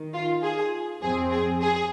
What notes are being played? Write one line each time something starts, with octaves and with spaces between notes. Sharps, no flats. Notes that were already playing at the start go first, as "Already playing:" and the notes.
Already playing: D#3
F4
G#4
F2 F3 C4 G#4
G#4
G#4